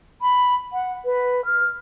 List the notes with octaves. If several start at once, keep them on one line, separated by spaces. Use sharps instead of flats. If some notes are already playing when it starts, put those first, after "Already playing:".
B5
F#5
B4
F6